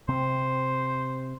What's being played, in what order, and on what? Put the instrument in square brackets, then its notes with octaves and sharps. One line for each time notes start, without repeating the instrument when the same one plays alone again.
[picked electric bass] C3 C4 [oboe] C5